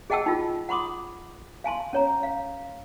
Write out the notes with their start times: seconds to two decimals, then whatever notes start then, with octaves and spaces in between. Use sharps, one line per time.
0.10 G#4 D#5 F#5 G5 A5 E6
0.26 D#4 F4
0.69 F#5 B5 C6 D6 D#6
1.64 F5 G#5 A5 C6
1.93 C#4 C#5 A#5
2.23 F5